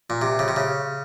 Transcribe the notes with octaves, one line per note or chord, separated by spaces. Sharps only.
A#2
C3
C#3
C3
C#3